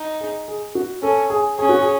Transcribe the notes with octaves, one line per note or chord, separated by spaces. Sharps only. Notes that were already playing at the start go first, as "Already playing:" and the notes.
Already playing: D#4
G#4
G#4
F#4
C#4 A4
G#4
C#4 G#4
F#4
G#4